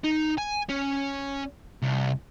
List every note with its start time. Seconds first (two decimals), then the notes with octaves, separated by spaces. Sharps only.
0.04 D#4
0.38 G#5
0.69 C#4
1.82 C2